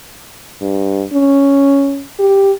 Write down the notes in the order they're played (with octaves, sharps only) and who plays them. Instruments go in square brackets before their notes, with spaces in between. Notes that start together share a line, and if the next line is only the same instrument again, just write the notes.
[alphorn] G2
C#4
G4